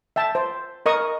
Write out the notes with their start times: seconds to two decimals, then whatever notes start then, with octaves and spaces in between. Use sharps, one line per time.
0.16 E5 G5 A5
0.35 C5
0.86 A#4 D#5 C#6 D#6